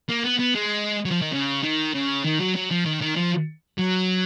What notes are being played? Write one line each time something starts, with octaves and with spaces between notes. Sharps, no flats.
A#3
B3
B3
G#3
F#3
F3
D#3
C#3
D#3
C#3
D#3
F#3
F#3
F3
D#3
D#3
F3
F#3